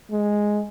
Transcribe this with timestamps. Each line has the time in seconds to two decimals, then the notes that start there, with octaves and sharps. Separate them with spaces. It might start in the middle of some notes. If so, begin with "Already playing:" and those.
0.11 G#3